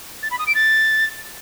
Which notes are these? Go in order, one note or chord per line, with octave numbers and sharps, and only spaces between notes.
A6
B5
D#6
D7
A6